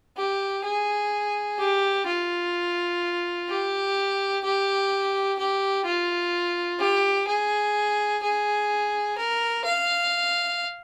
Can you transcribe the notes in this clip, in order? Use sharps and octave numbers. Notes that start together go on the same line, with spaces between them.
G4
G#4
G4
F4
G4
G4
G4
F4
G4
G#4
G#4
A#4
F5